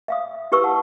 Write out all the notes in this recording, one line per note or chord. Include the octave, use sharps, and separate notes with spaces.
E5 F5 D#6
E4 G4 B4 C#6 E6
F#5 A5